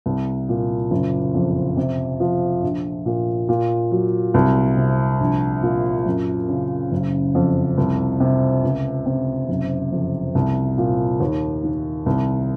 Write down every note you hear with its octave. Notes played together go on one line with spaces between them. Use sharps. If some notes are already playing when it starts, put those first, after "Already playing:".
C2
A#2
F#1
F2
C3
F3
A#1
A#2
A#2
F#3
C2
C3
A#1
A#2
F#2
C#3
F#1
F2
C2
C3
C#2
C3
F#1
F2
C2
A#2
D#2
D#3
C2